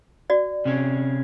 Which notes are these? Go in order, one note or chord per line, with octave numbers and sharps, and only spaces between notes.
F#4 D5
C3 C#4